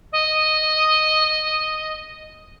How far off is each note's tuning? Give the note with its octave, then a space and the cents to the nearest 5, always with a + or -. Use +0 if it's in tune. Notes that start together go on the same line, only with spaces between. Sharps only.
D#5 -5